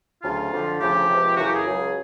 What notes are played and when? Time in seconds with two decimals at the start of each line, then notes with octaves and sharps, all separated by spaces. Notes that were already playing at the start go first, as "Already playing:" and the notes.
0.23 D2 C#3 F#3 F4
0.52 F2 D3 F3
0.80 D2 C#3 F3 G4
1.09 C#2 C3 F3
1.37 F#2 C#3 E3 F#4
1.47 G4
1.55 G#4
1.65 C#2 C#3 F#3